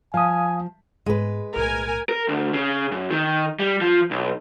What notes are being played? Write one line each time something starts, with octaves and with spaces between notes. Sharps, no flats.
F3 F5 G#5 D#6
G#2 G#3 B3 B4
B1 A2 A#4 G#5
A#4
D2
C#3
F#2
D#3
G3
F3
B1